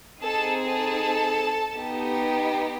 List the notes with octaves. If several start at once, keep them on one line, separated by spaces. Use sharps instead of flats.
C4 D#4 G#4 A4 A5
A4 A5
B3 D#4 G4